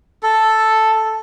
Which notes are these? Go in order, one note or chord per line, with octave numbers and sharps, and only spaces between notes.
A4